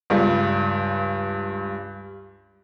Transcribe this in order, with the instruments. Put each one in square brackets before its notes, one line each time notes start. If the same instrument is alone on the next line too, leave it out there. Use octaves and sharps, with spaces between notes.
[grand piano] C#2 G2 G3